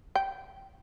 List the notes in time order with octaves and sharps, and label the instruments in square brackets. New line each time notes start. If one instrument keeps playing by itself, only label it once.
[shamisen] G5